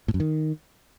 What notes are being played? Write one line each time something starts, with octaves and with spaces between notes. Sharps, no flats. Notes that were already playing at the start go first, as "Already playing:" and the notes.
A2
F#2
D#3